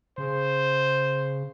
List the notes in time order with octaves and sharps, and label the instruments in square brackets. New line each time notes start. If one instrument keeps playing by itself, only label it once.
[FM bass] C#3 [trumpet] C5